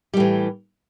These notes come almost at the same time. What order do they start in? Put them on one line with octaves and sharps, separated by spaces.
G3 A2 E3